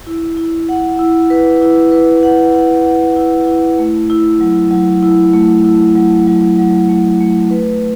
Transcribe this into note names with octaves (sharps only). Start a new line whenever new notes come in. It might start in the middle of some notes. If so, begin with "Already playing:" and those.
E4
E4
F#5
E4
B4
E4
B4
F#5
F#5
F#5
E4
E4
A3
E4
F#3
F#3
E4
A3
E4
F#3
F#3
F#3
A3
A3
B4